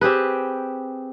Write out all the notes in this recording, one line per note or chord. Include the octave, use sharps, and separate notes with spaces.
C4 G4 G#4 B4